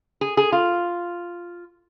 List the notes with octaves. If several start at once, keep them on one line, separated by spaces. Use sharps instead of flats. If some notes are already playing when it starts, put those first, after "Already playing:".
G#4
G#4
F4